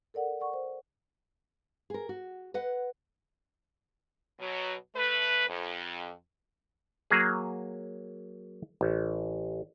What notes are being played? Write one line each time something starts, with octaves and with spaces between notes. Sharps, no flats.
A4 A#4 D5 F#5
D5 F#5 C#6
C5
G#4 A#4
F#4
B4 D#5 F#5
B2 F#3
A3 B4
F2
F#3 A#3 G#4
A1